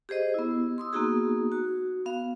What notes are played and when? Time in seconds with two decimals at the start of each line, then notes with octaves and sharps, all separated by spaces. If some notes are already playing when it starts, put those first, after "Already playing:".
0.09 G4 G#4 C5 D#5
0.34 B3 E4
0.78 C6 D#6 E6
0.93 A#3 B3 D#4 F#4 G#4
1.52 F#4
2.06 B3 F5